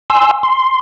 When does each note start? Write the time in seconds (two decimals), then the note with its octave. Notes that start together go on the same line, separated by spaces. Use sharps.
0.10 G#5 C6 E6
0.43 C6